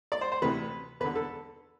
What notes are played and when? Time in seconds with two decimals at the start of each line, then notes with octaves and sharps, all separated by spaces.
0.12 D5
0.21 C5
0.32 C5
0.42 D2 C3 E3 B4
1.00 E2 D3 B4
1.15 A4